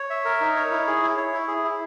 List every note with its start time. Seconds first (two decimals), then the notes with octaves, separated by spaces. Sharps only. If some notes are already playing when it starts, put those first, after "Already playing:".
Already playing: C#5
0.10 E5
0.25 A#4
0.41 D#4
0.56 C#5
0.72 E4
0.87 G#4
1.03 E4
1.18 C#5
1.34 E4
1.48 G#4
1.64 E4